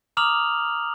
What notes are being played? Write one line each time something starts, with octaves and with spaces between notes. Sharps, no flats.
A#5 D6 D#6 F6 F7 F#7